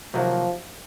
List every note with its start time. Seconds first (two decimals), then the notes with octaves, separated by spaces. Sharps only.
0.14 C3 D#3 F3 F#3 A#3